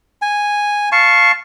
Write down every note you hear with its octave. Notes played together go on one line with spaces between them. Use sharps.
G#5
F5 A5 C#6